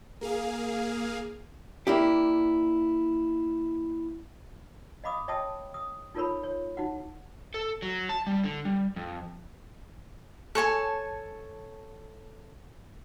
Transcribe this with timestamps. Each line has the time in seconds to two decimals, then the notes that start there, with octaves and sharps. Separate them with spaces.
0.21 A#3 G#4 F5
1.87 A#3 D4 E4 G4
5.04 D#5 F5 B5 D6 D#6
5.28 C#5 D#5 E5 G5 A5 D#6
5.74 D#6
6.14 D#4 F4 A4 A#4 C#5 B5
6.43 C#5
6.77 D#4 F#4 F#5
7.54 A4
7.82 F#3
8.09 A5
8.27 G3
8.44 D3
8.65 G3
8.96 F2
10.55 A4 C#5 G#5 A5